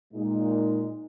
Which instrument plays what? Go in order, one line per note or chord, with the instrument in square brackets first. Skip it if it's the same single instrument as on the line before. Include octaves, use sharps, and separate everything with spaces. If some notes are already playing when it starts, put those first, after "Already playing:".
[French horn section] A#2 G#3 D#4